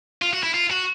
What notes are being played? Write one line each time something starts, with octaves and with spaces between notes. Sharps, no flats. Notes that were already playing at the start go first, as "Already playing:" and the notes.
F4
F#4
E4
F4
F#4